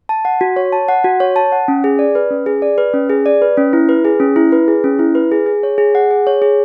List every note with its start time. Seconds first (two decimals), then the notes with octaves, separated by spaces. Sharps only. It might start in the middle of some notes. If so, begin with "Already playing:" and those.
0.09 A5
0.25 F#5
0.41 F#4
0.56 C#5
0.73 A5
0.89 F#5
1.04 F#4
1.20 C#5
1.36 A5
1.52 F#5
1.68 C#4
1.84 G#4
1.99 D5
2.15 B4
2.31 C#4
2.46 G#4
2.62 D5
2.78 B4
2.93 C#4
3.09 G#4
3.26 D5
3.42 B4
3.57 C#4
3.73 E4
3.89 B4
4.05 G#4
4.20 C#4
4.36 E4
4.52 B4
4.68 G#4
4.84 C#4
4.99 E4
5.15 B4
5.32 G#4
5.46 G#4
5.63 C#5
5.78 G#4
5.95 F#5
6.11 G#4
6.27 C#5
6.42 G#4